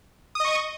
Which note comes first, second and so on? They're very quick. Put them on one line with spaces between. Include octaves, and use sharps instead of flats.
D#6 D#5 C#6